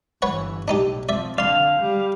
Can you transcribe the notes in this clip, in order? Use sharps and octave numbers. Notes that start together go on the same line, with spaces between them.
G1 E3 B4 C#5 F#5
B1 A2 D4 D#4 G4
F2 F3 D5 E5
D3 D5 F5 C6
G3